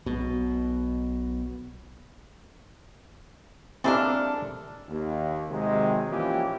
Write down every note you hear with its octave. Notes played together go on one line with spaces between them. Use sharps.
B1 B2
G#3 A#3 C4 D4 E4 G4 A4 F6
D#2
C3 D#3 F#3 G#3
A#2 E3 F3 A#3 C#4 G4